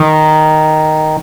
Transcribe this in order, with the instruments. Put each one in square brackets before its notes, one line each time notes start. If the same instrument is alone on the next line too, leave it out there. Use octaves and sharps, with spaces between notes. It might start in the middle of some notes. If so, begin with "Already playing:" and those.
Already playing: [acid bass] D#3